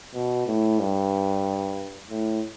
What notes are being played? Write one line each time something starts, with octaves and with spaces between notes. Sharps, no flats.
B2
A2
G2
A2